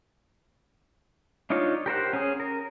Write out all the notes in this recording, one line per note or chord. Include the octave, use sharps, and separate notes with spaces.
D4 D#4 F4 C#5
G4 A#4 C5 F#5
C#4 G#4
A#4